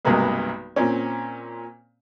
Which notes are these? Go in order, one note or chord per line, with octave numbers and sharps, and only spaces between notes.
B1 G2 C3 G#3 A#3 B3
A#2 C4 C#4